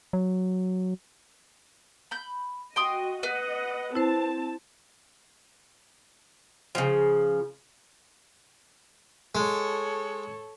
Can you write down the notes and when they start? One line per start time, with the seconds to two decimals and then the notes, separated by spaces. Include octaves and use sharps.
0.13 F#3
2.11 B5 G6
2.76 F#4 D#5 G5 C6 D#6
3.23 B4 D#5 F#5
3.95 C4 E4 C5 A5
6.75 C#3 F3
9.35 G#3 A4 C#5